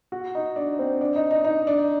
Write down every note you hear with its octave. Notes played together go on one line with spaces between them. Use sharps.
F#4
D#4
D4
C4
D4
D#4
D#4
D#4
D4